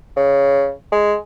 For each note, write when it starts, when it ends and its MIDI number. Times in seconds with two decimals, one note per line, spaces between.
0.17 0.70 49
0.92 1.15 56